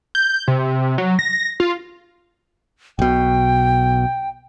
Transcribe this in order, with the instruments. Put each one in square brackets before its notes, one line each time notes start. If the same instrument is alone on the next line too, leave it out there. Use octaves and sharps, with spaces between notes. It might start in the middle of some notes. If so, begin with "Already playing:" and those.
[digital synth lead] G6
C3
F#3
A#6
F4
[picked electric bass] B1 B2 [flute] G5